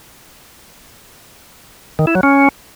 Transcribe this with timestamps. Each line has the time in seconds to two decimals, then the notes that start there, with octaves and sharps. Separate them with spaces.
1.99 D#3
2.07 E4
2.15 F#3
2.23 C#4